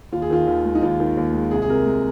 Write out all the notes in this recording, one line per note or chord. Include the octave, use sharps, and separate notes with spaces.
D#2 F4
G#4
D#3 F4
D#2
G#3
D#4
D#2 F4
D#3
D#2
G#3
C2 G#4
G#4
C3 A#4
G#3